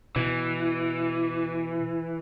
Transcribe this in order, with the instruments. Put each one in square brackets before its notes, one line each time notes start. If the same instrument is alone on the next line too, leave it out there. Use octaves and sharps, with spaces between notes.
[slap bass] B2 [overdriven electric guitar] E3